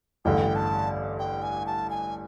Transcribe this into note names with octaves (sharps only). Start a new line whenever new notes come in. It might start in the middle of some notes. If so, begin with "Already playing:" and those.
A1 G2 D3 G5
A5
G5
G#5
A5
G#5